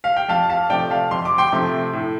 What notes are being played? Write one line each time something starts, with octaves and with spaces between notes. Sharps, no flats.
F5
G5
F2 F5 A5
F5 A5
C3 F3 A3 D5 G5
F5 A5
F2 C6
D6
G5 C6
C3 F3 A3
A2